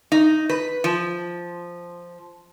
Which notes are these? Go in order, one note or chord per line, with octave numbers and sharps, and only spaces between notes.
D#4
B4
F3